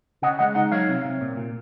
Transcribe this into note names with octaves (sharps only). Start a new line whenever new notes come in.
C#3 D#5 F#5
G#3 D#5 F#5
D#4 D#5 F#5
F#3 C#5 F5
C3
C3
A#2
A#2